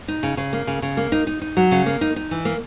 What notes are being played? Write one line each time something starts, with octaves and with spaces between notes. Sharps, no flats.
D#4
C#3
C#3
A#3
C#3
C#3
A#3
D#4
D#4
D#4
F#3
C#3
A#3
D#4
D#4
E3
A#3